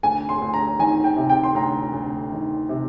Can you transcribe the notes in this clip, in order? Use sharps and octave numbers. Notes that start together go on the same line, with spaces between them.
D2 G#5
C6
D2
A#5
D#3 G#5
G5
C3
G5
C6
D2 A#5
D2
D#3
C3